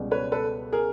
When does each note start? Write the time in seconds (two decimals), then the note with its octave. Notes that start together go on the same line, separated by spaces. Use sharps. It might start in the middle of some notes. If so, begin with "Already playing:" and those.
Already playing: C#2 B2 G3
0.11 B4 C#5
0.32 A4 B4
0.72 G#4 A#4